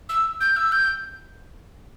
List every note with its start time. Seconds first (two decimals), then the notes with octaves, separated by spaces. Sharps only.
0.09 E6
0.41 G6
0.56 E6
0.72 G6